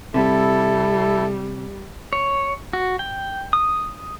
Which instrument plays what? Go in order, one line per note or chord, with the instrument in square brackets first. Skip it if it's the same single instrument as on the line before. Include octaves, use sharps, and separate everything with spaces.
[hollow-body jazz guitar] C3 [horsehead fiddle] G3 [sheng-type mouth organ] E4 A4
[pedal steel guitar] C#5
F#4
G5
D#6